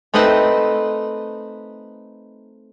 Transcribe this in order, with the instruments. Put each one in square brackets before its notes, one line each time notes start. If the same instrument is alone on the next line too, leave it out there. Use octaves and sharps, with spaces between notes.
[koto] A3 C4 D#4 B4 D#5 A5